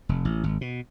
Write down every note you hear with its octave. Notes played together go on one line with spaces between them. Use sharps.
F1
A1
G#1
B2